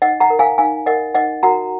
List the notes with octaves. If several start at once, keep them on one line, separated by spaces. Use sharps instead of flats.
D#4 D#5 F#5
F#5 A#5
A#4
F5 G#5
D#4 F5 G#5
A#4 D#5 F#5
D#4 D#5 F#5
F#4 A#4 F#5 A#5